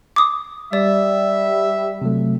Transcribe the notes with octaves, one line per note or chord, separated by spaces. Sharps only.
D6 D#6
G3 D5 E5
C3 F#3 A3